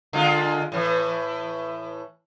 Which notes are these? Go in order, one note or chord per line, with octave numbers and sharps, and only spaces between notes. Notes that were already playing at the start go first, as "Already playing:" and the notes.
D3 G#3 F4
A2 E3